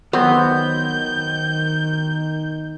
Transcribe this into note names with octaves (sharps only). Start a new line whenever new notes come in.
D#3 F#3 B3 C4 C5 G6